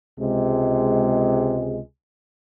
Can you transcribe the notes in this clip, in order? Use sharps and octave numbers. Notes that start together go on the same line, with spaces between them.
C#2 C3 G#3